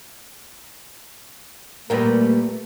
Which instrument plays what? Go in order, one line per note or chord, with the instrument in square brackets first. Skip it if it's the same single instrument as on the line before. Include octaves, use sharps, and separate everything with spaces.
[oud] A#2 G3 A#3 [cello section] A3 [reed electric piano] A#4 B4